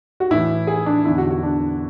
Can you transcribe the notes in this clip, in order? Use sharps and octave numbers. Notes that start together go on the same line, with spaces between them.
F#4
A2 E3 E4
G#4
D4
E2 D3 E4
F#4
F#4
D4